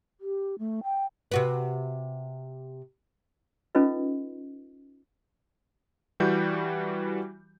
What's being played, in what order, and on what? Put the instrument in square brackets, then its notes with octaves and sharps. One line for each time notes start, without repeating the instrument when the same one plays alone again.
[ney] G4
A3
G5
[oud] C3 F#4 B4
[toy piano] C#4 D#4 F4 A4 B4 D#5
[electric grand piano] E3 G3 F#4 G6